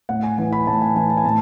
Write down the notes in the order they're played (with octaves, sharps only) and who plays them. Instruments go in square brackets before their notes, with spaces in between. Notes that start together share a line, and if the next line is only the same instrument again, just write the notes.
[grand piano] A2 F#5
G#5
E3 G#5
B5
A2 A5
G#5
E3 G#5
A5
G#5
A2 A5